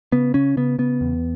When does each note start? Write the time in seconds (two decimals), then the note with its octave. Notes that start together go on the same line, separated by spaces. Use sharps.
0.12 C#3 B3
0.34 C#3 C#4
0.57 C#3 B3
0.78 C#3 B3
1.01 E2